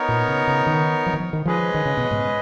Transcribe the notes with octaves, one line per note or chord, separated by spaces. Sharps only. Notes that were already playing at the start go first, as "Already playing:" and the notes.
Already playing: B3 D#4 A#4 C#5
A#2
C#3
C#3
D#3
F3
D#3
F3
D#3
F3 G#3 C#4 G#4 B4 D#5
D#3
C#3
B2
G#2